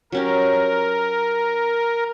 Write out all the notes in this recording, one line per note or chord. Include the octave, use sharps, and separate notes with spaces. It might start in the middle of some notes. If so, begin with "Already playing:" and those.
F#3 C#4 G4 A#4